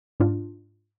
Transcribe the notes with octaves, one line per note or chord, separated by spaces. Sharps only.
G#2 D4 F4